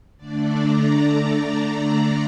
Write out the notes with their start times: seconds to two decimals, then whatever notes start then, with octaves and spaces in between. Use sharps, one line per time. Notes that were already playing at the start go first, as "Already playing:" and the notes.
0.17 D3 A3 D4 D5
0.56 A#5